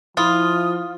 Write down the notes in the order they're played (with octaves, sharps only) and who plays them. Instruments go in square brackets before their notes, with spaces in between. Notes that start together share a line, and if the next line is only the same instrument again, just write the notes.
[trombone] F3 [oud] E4 [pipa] F4 [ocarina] D#6